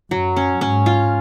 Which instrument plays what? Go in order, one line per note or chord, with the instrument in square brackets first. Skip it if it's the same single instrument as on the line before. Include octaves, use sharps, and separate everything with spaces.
[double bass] F#2 [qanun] F#3
[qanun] C#4
[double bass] G#2 [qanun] C#4
[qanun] F4